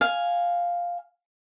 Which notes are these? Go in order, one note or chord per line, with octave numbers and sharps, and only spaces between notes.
F5 G#5